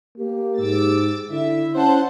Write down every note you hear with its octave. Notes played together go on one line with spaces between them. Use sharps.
A#3 G4
G#2 D6 E6 A6
D3 E4 E5
C#4 C5 F#5 A5